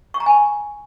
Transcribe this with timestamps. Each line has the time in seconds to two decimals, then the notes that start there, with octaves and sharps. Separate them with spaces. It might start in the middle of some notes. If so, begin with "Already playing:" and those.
0.14 C#6
0.20 A#5
0.26 G#5